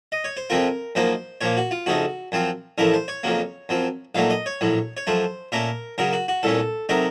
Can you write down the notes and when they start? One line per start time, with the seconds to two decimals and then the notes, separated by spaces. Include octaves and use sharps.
0.12 D#5
0.24 C#5
0.37 C5
0.50 F2 C3 F3 C4 F4 A#4
0.95 F#2 F3 A#3 D#4 C5
1.41 A#2 F3 A#3 C#5
1.57 F#4
1.71 F4
1.86 F2 C#3 A3 D#4 F#4
2.32 F#2 F3 C4 F4
2.78 A1 A2 F3 A3 C#4 A#4
2.94 C5
3.08 C#5
3.23 F2 C#3 F#3 A#3
3.69 F#2 F3 C4
4.15 A#1 A#2 F#3 A3 D#4 F5
4.30 D#5
4.46 C#5
4.61 A#1 A2 F#3
4.97 C#5
5.07 F#2 F3 A3 C5
5.52 A#2 A3 C#4 A#4
5.98 F#2 C#3 F#3 A#4
6.13 F#4
6.28 F#4
6.43 C2 A#2 A3 C#4 A4
6.89 C3 F#3 A3 D#4 A#4